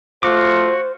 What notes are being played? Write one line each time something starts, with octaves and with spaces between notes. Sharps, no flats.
A3 F4 F#4 C5 D6